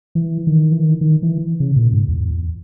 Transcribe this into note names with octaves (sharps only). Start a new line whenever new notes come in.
E3
D#3
E3
D#3
D#3
E3
C#3
A#2
G#2
E2